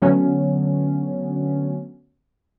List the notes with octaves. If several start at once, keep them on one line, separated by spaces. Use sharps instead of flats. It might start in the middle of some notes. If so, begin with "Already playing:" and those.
D3 F#3 A3 B3 C#4